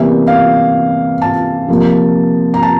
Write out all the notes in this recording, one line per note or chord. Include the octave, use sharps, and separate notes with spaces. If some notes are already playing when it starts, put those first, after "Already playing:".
Already playing: E2 C3 E3 G3 A#3 E5
F5
A5
C3 F3 A#3
A#5
A5